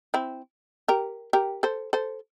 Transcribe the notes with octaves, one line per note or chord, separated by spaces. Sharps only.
C4 E4
G4 A#4
G4 A#4
A4 C5
A4 C5